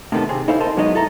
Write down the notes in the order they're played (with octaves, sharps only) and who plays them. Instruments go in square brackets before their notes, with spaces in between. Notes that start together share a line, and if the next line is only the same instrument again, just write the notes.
[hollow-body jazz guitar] A2 C3 D#3 B3 A4
C3 C4 G#4
D#4 E4 A4 C5 F5
A4 A#4 C5 D#5 A5
B2 F#3 G#3 B3 D#4 D#5
E4 A4 A#5